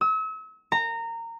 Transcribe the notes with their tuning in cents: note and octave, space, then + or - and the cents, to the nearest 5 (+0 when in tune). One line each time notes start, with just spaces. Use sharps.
E6 -40
A#5 -20